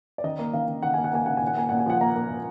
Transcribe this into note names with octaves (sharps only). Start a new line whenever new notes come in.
D5
D#3 D#5
A#3
D#3 F5
D#3
D#3 F#5
A#3 G#5
F#5
A#3 G#5
D#3 F#5
A#2 G#5
F#5
A#3 G#5
A#2 F#5
G#5
F3 F#5
A#3 A#5
A#3
A#2